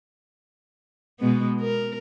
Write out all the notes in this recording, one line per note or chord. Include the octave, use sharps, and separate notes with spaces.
B2 G#3 B3
A#4